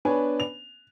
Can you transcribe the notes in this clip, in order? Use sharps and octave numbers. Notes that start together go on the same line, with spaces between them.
B3 D4 B4 C#5 G#5
F7